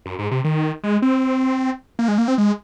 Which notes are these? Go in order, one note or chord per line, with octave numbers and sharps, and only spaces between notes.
F#2
G#2
C3
D#3
G#3
C4
A#3
G#3
A#3
C4
G#3